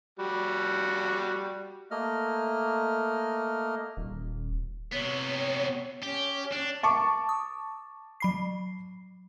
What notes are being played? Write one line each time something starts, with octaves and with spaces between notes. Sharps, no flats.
G3 F#4
A3 A#3 D#5 F6
D#1
C3 B3 C#5
C#4 G4
D4
A5 C#6 D6
D#6
F#3 B5 C7